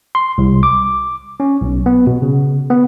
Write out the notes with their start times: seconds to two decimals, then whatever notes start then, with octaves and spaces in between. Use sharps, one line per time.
0.15 C6
0.38 C2
0.63 D6
1.40 C#4
1.61 B1
1.86 B3
2.07 B2
2.22 C#3
2.70 B3